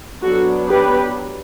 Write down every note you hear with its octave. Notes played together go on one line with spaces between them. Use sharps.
F#3 B3 D4 F#4 A4
G4 B4